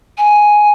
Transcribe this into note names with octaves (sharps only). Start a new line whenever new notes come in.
G#5